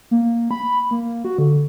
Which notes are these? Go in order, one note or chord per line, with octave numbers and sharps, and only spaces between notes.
A#3
B5
A#3
F#4
D3